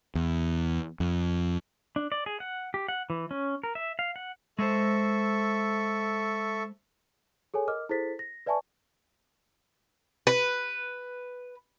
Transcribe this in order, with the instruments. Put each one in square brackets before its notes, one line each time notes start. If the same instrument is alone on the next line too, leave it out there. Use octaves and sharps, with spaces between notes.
[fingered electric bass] E2
F2
[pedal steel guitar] D4
D5
G#4
F#5
G4
F#5
E3
C#4
A#4
E5
F5
F#5
[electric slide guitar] G#3 C5 [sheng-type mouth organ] A4 E5 C#6
[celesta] G#4 A4 C#5 G#5
A#4 D#5 D6 F6
E4 G#4 A4 C5 A6 B6
A#6
B4 D5 E5 G#5 A5 C#6
[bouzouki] B4